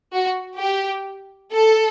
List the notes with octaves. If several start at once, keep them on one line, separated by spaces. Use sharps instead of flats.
F#4
G4
A4